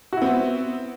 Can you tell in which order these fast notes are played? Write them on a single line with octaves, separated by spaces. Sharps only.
F#4 E4 C4 B3